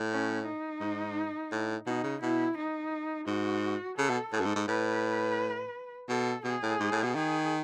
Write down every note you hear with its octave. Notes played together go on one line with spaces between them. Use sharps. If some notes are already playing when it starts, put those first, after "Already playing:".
Already playing: A2
C#4
D#4
G#2
A2
B2 D#4
C#3
B2 E4
D#4
G#2 F#4
C#3 A4
B2
A2 A4
F#2
G#2
G#2
A2 B4
B2 A4
B2 G#4
A2
G#2
A2
B2
D#3 G#4